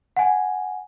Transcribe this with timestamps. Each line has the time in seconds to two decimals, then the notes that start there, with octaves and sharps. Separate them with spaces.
0.17 F#5 G#5